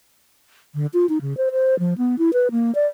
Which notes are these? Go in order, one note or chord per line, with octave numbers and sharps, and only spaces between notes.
D3
F4
D#4
C#3
C5
C5
F3
B3
E4
B4
A#3
D5